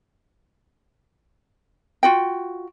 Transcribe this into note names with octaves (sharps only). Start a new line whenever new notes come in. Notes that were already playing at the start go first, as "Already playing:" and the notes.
F4 F#4 G5